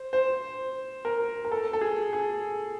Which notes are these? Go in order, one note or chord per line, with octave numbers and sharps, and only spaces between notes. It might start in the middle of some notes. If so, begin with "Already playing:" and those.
Already playing: C5
C5
A#4
A#4
A4
A4
G#4
G#4